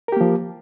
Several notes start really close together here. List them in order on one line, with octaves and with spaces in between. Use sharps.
A#4 G4 A#3 F3